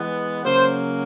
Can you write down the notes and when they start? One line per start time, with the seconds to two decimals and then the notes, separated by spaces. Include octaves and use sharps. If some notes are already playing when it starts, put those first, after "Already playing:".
Already playing: E3 G#3 B3
0.44 C#3 F#3 A#3 C5